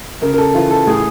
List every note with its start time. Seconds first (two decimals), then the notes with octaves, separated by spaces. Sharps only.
0.22 C#3 A#4
0.33 A#4
0.38 A4
0.54 E3 F4
0.71 A4
0.87 A2 G#4